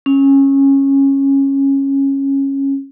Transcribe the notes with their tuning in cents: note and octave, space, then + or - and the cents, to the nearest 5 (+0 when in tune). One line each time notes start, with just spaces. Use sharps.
C#4 -15